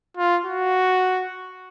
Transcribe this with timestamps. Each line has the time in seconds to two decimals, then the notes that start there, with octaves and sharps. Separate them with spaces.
0.17 F4
0.46 F#4